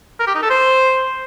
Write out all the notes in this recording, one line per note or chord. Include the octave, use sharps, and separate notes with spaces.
A#4
G4
D#4
A4
C5